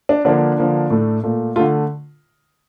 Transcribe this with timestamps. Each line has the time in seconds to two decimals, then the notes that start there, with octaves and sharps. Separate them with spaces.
0.09 D4
0.25 D3 F3 A#3 D4
0.58 D3 F3 A#3
0.90 A2 A3
1.23 A#2 A3
1.56 D3 A3 F4